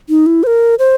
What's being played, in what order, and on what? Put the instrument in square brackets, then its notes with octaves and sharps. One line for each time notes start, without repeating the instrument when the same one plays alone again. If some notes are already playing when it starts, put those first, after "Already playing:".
[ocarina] D#4
E4
C5
A#4
C5